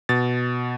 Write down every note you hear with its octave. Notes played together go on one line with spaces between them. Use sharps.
B2 A6